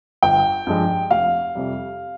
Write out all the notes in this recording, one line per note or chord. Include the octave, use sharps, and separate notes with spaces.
G1 G5
G2 F3 G#3
F1 F5
F2 C3 G3